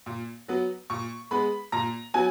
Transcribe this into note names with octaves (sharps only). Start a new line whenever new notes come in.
A#2
F#3 B3
A#2 C#6
G#3 B3 B5
A#2 A#5
F#3 B3 G#5